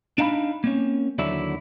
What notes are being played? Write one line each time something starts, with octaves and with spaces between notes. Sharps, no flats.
D4 D#4 F5 A5 B5
A#3 C4 C#4
D#2 D3 F#3 E4 D5 E5